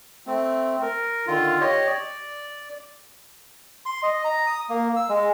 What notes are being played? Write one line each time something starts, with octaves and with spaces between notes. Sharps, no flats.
A3 C4
A#4
D3 D#3 F4
G4 C#5 D#5
D5
C6
D#5
A#5
D#6
A#3
E6
G#3